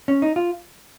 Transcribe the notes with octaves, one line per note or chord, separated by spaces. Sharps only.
C#4
D#4
F4